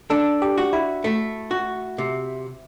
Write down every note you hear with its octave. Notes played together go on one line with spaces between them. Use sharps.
D4 A4
G4
F#4
E4
A3
F#4
C3